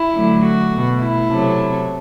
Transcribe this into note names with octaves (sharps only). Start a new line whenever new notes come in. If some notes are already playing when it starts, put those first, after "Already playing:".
Already playing: E4
D3 F#3 A3
F#4
B2 A3
E4
C3 F#3 A3